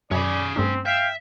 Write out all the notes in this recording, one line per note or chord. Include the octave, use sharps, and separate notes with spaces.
F#2 C#4 G#4 D5 B5
G2 A3 C4 D4
E5 F5 G5